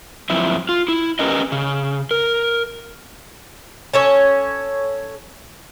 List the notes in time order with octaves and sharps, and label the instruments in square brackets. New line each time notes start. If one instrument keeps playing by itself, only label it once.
[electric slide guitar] F#2 F3 C4 E4
F4
E4
C#4 G4 A#4 B4 D#5
C#3
A#4
[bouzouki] C#4 A4 C#5